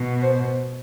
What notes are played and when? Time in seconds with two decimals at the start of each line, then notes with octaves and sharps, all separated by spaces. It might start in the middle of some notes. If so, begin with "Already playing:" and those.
Already playing: B2
0.22 C5